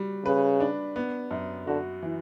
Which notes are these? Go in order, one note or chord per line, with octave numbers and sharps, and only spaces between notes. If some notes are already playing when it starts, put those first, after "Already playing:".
Already playing: G3 F#4
C#3 B4
D4
B3
F#2
D3 F#4
E3